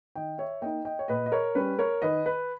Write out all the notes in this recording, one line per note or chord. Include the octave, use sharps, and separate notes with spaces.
D#3 D#5 G5
C#5 E5
A#3 D#4 D#5 G5
D#5 G5
C#5
A#2 B4 D#5
D#5
A#4 C#5
G3 C#4 B4
A#4 C#5
D#3 B4 D#5
B4